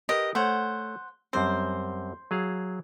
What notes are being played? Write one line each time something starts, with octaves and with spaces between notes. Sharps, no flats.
G4 A#4 B4 D#5
A3 C5 C#5 F#5
F#2 G3 C4 C5
F#3 G#4 F5